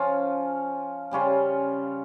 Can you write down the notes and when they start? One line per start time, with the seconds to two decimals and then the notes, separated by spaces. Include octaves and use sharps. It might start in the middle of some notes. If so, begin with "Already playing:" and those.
Already playing: F3 C#4 F4
1.11 C#3 G3 C#4 F4